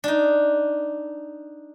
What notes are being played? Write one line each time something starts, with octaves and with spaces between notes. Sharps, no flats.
D4 D#4